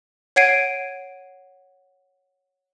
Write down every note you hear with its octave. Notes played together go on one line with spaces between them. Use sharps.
C#5 F#5 G#6 C7 D7 D#7